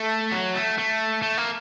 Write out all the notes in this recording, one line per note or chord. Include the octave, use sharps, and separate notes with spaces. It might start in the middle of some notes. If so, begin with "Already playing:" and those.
Already playing: A3
F#3
A3
A3
A3
A#3